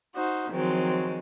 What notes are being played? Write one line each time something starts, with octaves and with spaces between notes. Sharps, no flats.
D#4 F#4 C5
D#3 F3 F#3 G#3 C4